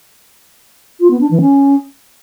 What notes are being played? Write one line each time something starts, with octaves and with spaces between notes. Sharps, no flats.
F4
B3
D4
E3
C#4